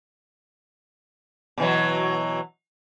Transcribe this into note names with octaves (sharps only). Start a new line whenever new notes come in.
B2 E3 F#3